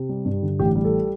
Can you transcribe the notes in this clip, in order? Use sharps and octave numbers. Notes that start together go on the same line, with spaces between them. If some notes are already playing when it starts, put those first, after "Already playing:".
Already playing: C3
G3
G2
D3
A1 G4
G3
A4